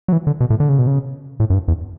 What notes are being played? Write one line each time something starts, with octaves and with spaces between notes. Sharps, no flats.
F#3
E3
D3
B2
A2
D3
C#3
B2
C#3
A2
F#2
G2
E2